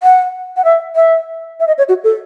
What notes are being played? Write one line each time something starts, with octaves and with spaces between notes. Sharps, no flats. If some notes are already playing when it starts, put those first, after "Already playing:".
F#5
F#5
E5
E5
E5
D#5
C#5
F#4
A4